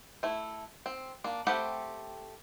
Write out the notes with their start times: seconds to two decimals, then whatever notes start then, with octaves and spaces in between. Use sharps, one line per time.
0.23 A3 E4
0.86 C4
1.24 A#3 D4
1.47 A3 C4 G4 F#5 B5